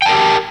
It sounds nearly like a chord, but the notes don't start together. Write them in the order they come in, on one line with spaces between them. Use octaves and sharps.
G5 A5 A#4 G4